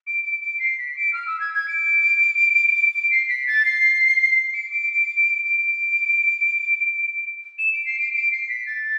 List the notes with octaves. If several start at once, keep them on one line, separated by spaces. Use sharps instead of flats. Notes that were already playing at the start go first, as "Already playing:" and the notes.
D7
D7
D7
C7
B6
D7
F6
E6
G#6
G#6
D7
D7
D7
C7
B6
A6
C7
D7
D7
D7
E7
D7
C7
D7
D7
C7
B6
A6